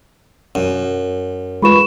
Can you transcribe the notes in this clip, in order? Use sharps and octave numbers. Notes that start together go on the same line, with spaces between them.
F#2
G#3 F4 B4 B5 C#6 E7